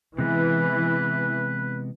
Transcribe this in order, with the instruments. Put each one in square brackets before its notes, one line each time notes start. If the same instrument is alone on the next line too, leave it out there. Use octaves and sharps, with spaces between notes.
[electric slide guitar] C3 G#3 B3 [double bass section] E3 [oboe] B4